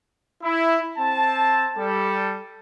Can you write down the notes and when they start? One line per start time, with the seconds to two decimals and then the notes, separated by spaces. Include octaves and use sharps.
0.43 E4
0.98 C4 A5
1.78 G3 A4